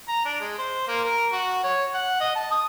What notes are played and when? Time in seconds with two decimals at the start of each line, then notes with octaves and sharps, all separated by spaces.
0.08 A#5
0.25 D4
0.40 G#3
0.58 C5
0.88 A#3
1.04 A#4
1.32 F#4
1.64 C#5
1.94 F#5
2.20 D#5
2.35 A5
2.51 D#6